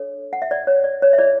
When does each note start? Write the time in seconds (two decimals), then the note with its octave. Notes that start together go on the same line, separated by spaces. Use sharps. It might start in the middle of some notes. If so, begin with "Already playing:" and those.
Already playing: D4 A4 C#5
0.33 F#5
0.42 E5
0.51 D5
0.67 C#5
0.84 D5
1.02 C#5
1.13 E5
1.18 E4 G#4 C#5 D5